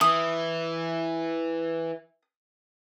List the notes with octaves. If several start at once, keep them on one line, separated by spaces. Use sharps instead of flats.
E3 D#6